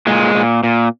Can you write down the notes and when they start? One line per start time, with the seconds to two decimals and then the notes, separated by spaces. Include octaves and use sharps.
0.07 A#2 G#3
0.35 A#2
0.64 A#2